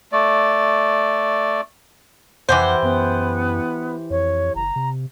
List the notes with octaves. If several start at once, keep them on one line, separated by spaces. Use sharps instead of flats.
A3 D5
F2 E3 G4 C5 F#5
F#2 B3
F2 C#5
F#1 A#5
C3